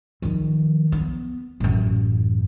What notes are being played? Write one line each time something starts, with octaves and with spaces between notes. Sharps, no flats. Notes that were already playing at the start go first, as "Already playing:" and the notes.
D#3 F3
B3
A1 F#2